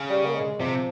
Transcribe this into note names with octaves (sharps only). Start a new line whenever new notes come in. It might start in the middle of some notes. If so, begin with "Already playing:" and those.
Already playing: C#3
G3
A#3
G#3
C3 F3